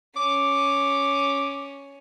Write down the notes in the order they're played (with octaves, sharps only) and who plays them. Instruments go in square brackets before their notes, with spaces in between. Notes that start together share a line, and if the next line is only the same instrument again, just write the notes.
[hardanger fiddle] C#4 [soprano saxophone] D6